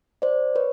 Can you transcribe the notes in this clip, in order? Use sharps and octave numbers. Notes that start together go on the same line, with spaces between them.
C5 D5
B4 C#5